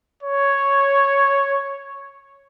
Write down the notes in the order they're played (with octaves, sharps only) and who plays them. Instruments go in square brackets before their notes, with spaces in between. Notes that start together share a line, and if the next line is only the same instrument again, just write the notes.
[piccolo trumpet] C#5